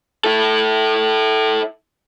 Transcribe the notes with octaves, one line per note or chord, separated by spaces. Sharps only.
E4 A4